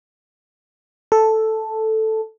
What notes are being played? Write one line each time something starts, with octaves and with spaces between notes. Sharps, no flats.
A4